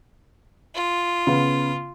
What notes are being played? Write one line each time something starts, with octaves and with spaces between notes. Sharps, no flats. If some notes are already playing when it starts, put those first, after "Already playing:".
F4
C#3 B3